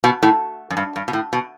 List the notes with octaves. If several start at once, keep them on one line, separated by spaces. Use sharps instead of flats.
B2
A2
F#2
G2
G2
B2
A2
B2